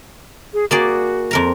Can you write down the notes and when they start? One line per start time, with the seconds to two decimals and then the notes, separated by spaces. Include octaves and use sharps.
0.54 G#4
0.71 A#3 F#4 G#4 D5
1.31 F2 A#4 A#5